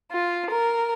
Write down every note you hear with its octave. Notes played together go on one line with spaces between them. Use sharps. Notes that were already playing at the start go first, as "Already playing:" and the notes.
F4
A#4